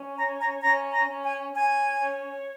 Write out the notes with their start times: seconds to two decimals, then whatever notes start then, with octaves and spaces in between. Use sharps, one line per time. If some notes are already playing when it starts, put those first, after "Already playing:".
Already playing: C#4
0.15 C#5 A#5
0.38 A#5
0.61 C#4 A#5
0.92 A#5
1.08 C#4
1.23 G#5
1.53 C#4 G#5
1.99 C#5